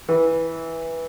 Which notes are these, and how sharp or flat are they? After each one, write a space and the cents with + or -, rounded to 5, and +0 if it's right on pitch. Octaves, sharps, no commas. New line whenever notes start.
E3 -10